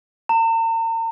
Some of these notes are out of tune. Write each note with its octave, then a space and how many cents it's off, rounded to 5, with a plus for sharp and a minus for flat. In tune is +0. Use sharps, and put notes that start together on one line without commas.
A#5 -40